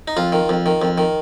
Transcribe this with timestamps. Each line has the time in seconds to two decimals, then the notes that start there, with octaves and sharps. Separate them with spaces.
0.08 D#4
0.17 F2 F4
0.32 D#3
0.49 F2
0.66 D#3
0.82 F2
0.98 D#3